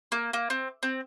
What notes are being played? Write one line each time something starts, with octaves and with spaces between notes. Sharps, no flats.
A#3
A#3
C4
C4